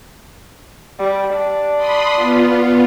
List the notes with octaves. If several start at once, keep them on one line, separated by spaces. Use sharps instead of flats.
G3
D4
B5 C6 D#6
B3 F4